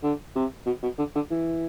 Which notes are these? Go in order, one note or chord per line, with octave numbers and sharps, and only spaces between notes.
D3
C3
B2
B2
D3
D3
E3